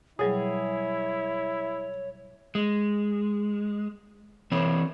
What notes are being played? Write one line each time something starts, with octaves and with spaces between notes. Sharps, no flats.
B2 F#3 G3 E4 G#4 C#5
G#3
E3 C4 C#5